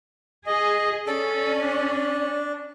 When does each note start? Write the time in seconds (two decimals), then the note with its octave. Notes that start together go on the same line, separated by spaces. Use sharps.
0.47 G#4 D#5
1.07 C#4 A4 D5
1.61 D4